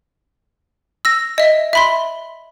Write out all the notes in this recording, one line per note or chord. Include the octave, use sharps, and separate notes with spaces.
E6 A#6
D#5 E5
E5 B5 C6